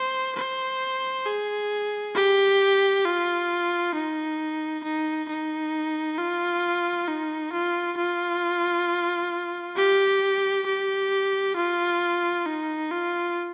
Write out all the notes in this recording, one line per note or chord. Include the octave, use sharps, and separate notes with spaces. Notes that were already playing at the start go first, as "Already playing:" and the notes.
Already playing: C5
C5
G#4
G4
F4
D#4
D#4
D#4
F4
D#4
F4
F4
G4
G4
F4
D#4
F4